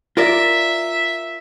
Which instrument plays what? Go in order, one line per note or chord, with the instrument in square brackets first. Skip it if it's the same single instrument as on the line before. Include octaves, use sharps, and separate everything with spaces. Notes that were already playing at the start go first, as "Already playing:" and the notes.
[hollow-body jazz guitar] F4 A#4 D5 [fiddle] E5